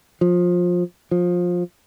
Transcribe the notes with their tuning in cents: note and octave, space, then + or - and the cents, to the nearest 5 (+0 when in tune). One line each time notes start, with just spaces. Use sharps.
F3 +20
F3 +20